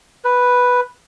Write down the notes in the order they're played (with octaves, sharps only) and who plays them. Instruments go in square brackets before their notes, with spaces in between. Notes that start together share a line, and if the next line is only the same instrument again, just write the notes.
[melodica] B4